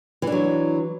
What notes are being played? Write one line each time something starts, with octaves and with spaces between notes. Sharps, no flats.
E3 F#3 D4